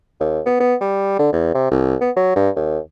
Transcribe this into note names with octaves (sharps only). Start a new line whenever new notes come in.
D#2
B3
B3
G3
D3
E2
C3
C2
B3
F#3
G2
D#2